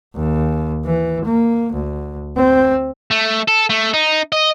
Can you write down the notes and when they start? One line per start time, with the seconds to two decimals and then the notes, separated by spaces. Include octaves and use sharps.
0.15 D#2
0.85 E3
1.25 A#3
1.73 D2
2.36 C4
3.11 A3
3.48 A4
3.70 A3
3.94 D#4
4.32 D#5